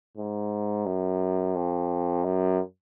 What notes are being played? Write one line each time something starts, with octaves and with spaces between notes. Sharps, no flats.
G#2
F#2
F2
F#2